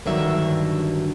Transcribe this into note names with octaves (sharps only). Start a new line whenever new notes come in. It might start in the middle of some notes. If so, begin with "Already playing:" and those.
G2 D3 D#3 F#3 E5